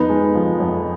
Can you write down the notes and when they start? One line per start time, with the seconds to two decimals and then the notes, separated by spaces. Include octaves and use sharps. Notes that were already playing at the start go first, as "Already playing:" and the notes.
Already playing: F2 B3 D#4
0.09 G#3
0.35 F3
0.60 F2